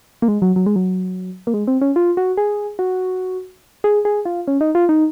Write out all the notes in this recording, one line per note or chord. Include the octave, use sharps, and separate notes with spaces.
A#3
G#3
F#3
F#3
G#3
F#3
A#3
G#3
C4
C#4
F4
F#4
G#4
F#4
G#4
G#4
F4
C#4
D#4
F4
D#4